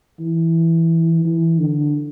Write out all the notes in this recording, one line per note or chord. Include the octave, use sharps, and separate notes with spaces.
E3
E3
D3